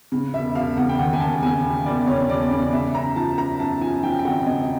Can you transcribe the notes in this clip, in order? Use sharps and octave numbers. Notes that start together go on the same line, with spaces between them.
C#3
E1 E5
E1 F5
C#3 F#5
G5
D#2 F#5
G#5
D#2 A5
C#3 G#5
E1
E1 D5
C#3 C#5
E1 D5
C#3 D5
C#3 E5
F#2 A#5
F3 A5
F#2 A#5
F#2 A5
F3 G#5
F3 G5
G5
G#1 F#5
C#3 D#5
D#5